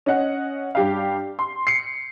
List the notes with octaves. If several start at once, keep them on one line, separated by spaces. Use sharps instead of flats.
C#4 D#5 F#5
G2 G4 F5
C6
C7 C#7